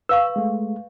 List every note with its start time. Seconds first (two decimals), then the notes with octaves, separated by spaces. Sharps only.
0.09 B4 F5 C#6 E6
0.36 G#3 A3